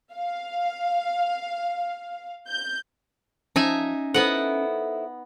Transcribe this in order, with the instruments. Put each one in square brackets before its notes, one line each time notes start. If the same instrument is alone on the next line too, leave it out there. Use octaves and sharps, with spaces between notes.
[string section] F5
G6
[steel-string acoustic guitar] F3 A5 [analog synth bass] C#4 [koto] D#4 E5 G#5
[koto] B3 D#5 F#5 [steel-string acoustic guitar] E4 A4 C5